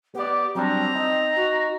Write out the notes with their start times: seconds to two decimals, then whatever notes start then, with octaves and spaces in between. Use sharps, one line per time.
0.15 B3 G4 D5
0.55 F#3 G3 C4 D4 A#5
0.95 D#4
1.36 F#4